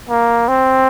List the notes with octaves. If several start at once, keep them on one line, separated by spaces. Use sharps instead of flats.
A#3
C4